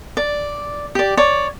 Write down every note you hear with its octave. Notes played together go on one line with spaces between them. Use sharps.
D5
G4 D5
C#5 D5